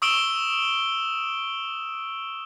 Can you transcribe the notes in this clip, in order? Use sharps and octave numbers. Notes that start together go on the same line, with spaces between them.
C#6 D#6 E6 D7 E7 G7